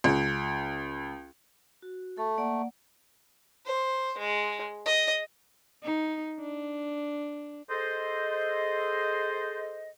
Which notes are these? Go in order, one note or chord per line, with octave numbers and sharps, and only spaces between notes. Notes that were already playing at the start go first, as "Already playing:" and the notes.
C#2
F#4
A3 A4
A#3 D5 F#5
C5
G#3
D#5
D#4
D4
G#4 A4 C5 D#5